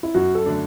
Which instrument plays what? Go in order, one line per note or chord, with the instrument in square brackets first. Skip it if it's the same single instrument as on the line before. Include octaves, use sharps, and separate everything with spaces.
[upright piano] E4
[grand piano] F#2 [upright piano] F#4
[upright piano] A4
[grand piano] D3 F#3 A3 D4